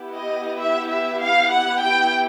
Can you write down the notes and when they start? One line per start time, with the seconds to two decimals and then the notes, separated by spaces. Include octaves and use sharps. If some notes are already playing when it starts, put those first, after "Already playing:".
Already playing: B3 E4 G4
0.14 D#5
0.60 E5
0.89 E5
1.20 F5
1.51 F#5
1.81 G5